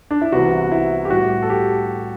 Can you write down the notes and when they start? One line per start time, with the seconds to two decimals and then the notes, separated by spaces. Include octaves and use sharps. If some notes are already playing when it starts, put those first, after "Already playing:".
0.11 D4
0.21 E4
0.32 C2 C3 E3 B3 F#4
0.71 E4
1.05 G4
1.10 A2 G3 B3 F#4
1.42 A4
1.50 G4